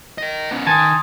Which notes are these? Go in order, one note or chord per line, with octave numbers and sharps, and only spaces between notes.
A#4 D#5
B3 C#4
D#3 G#5 A5 C6 D#6